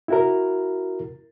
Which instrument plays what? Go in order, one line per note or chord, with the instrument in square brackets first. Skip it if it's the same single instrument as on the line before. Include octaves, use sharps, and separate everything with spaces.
[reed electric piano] E4 F#4 A#4